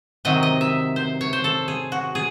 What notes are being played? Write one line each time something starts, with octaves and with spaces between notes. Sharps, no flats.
C3 D#3 F#3 D#5
D#5
E5
C5
C#5
C5
A4
G#4
F#4
G#4